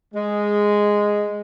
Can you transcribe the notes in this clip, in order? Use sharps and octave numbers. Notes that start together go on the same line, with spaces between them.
G#3